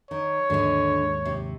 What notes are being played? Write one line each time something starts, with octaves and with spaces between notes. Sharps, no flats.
D#3 C#5
D#2 G#2 D3 G#3
C3